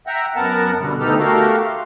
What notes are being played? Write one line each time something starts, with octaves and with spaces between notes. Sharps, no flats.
E5 F#5 G5 A#5
F#2 B3 A#4 F#5 A5
B2 D3 G3
D2 B3 D#4 G4 A4 F6
A3 F#4 G4 A4 A#4 F5
C6